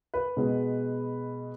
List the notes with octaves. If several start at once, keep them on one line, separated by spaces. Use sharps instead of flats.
B4
B2 G#3 B3